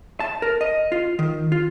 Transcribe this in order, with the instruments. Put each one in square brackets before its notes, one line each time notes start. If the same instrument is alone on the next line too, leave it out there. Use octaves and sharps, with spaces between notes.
[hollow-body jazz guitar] A5
A#4
D#5
F4
D#3
F4